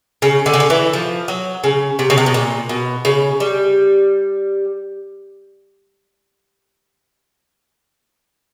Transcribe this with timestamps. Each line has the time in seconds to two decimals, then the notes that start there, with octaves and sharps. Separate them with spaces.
0.22 C#3
0.46 D3
0.54 C#3
0.60 D3
0.70 E3
0.93 F3
1.28 F#3
1.64 C#3
1.99 C3
2.10 C#3
2.18 C3
2.26 B2
2.34 A#2
2.69 B2
3.05 C#3
3.40 G3